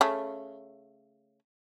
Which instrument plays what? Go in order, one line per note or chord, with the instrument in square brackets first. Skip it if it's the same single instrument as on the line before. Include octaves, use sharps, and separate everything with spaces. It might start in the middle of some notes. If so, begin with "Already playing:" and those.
[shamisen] C#3 A3